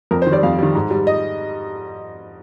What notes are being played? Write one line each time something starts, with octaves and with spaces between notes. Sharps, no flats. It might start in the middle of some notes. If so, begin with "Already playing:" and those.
F2 A#4
C5
D#3
G3 D5
F2 F5
D#3 G3
G#2
G3
D#5